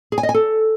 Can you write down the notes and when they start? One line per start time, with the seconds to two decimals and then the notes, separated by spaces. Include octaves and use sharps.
0.12 G#4
0.18 G#5
0.23 D#5
0.29 G#5
0.34 A4